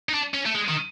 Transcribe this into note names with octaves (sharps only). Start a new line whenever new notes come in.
D#4
D4
C#4
A3
G#3
D#3